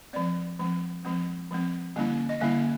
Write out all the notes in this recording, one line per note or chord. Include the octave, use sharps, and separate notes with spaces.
F3 G#3 C4 D5
F3 G#3 C4
F3 G#3 C4
F3 G#3 C4
D3 G3 A#3 C#4 E4
D#5
D3 G3 A#3 C#4 E4 E5